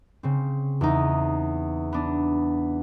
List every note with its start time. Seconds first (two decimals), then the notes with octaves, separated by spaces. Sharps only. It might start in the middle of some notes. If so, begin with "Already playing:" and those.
0.23 C#3 C4
0.81 E2 D#4
1.93 B3 D4